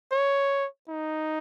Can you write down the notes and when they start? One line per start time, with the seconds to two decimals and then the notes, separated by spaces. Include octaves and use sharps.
0.12 C#5
0.89 D#4